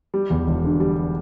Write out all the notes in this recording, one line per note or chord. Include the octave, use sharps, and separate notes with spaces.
G3
E2
E1
D3
G3